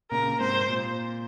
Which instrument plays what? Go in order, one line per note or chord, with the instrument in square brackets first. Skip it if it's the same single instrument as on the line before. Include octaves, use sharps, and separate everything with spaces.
[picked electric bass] A#2 C#3 [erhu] A#4
[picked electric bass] G#2 C3 [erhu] C5
[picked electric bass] A#2